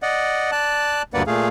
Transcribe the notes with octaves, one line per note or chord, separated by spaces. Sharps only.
D5 D#5 F#5
D5 A5 F#6
D2 G2 A#3 B4 D5 F#5
A#2 A3 G#4 F5